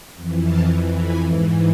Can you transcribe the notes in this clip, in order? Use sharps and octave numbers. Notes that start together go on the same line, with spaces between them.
F2 E3
F5 A5
G#5 B5
G#2 E3